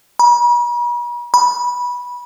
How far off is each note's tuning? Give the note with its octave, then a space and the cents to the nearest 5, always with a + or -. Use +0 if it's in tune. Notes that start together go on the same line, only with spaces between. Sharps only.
B5 -45
B5 -15